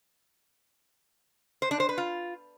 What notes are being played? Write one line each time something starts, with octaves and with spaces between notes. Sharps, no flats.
C5
D4
C5
B4
F4